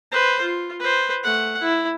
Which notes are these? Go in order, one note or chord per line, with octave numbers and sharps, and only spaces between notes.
B4 C5
F4
B4 C5
A3 F#5
E4